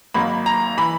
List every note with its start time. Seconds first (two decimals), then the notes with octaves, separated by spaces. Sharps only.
0.14 G#1 G#2 F#3 A#3 B5
0.46 A#5
0.77 E3 B5